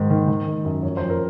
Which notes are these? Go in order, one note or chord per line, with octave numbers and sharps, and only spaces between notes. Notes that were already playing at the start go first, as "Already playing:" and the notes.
Already playing: G#2 D#3
D#3
D#3
D#3
F#2
F2 C#5
F2 C5
A#4